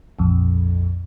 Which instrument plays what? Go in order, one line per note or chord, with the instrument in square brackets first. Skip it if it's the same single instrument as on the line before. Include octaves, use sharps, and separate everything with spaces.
[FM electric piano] A#1 F2